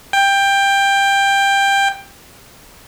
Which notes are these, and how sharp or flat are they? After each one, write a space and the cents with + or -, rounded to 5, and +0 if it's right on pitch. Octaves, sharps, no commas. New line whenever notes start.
G5 +15